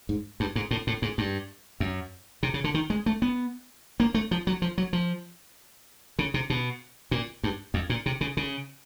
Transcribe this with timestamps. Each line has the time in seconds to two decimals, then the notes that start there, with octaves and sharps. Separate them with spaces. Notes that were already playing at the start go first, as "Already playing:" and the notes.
0.09 G#2
0.40 G2
0.56 G#2
0.71 A2
0.87 A2
1.02 G#2
1.18 G2
1.80 F#2
2.43 C3
2.54 C#3
2.64 D3
2.74 D#3
2.90 G#3
3.06 A3
3.22 B3
4.00 A#3
4.14 A3
4.31 F3
4.47 F#3
4.62 F3
4.78 F#3
4.93 F3
6.19 C#3
6.34 C3
6.50 B2
7.11 A#2
7.44 G2
7.74 F2
7.90 A#2
8.06 C3
8.21 C#3
8.37 C#3